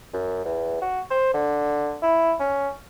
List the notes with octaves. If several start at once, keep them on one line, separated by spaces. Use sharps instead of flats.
F#2
E2
F#4
C5
D3
E4
C#4